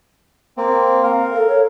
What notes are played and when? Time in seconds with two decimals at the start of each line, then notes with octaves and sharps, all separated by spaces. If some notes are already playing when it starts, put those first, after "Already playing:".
0.57 A#3 C4
1.03 A#4 F5
1.33 A4
1.48 C#5